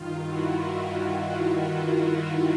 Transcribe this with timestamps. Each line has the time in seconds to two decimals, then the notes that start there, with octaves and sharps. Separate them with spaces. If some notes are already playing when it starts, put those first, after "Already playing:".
Already playing: G2 D#3 F4
0.25 E4 F#4